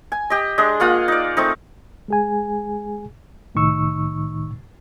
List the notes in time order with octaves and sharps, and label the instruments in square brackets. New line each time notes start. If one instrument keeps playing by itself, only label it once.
[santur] G#5
G4 D#5
G#3 D4 G#4 D#5
A#3 F4 F#5 D#6
D#4 D5
A3 C4 D#4
[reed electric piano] G#3 G#4 G#5
C2 A2 D#3 D#4 C#6 E6